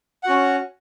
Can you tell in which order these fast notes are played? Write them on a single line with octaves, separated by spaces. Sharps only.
F#5 F#4 C#4